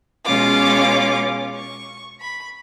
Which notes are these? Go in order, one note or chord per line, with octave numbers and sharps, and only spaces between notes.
B2 G#3 C#4 F4 D6
C#6
B5